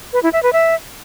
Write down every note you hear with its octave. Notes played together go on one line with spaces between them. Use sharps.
B4
E4
E5
B4
E5